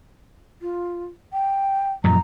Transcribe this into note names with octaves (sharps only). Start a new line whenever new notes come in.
F4
G5
F#2 A#2 F3 A#5